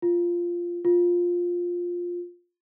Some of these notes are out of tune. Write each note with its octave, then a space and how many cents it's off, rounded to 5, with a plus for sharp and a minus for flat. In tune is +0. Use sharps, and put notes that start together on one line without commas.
F4 -5
F4 +10